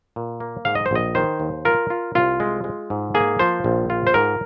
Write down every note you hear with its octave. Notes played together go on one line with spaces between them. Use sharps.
A#2
A#3
G#2 F5
D#5
C5
A#1 D#5
D#3 C5
D#2
F4 A#4
F4
C2 F4
G#3
G#3
G#2
A#3 G#4
F3 C5
A#1
F4
C5
G#2 A#4